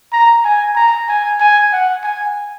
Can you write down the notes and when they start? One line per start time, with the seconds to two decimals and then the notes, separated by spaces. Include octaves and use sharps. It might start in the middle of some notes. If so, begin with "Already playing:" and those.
0.12 A#5
0.44 G#5
0.75 A#5
1.08 G#5
1.40 G#5
1.72 F#5
2.03 G#5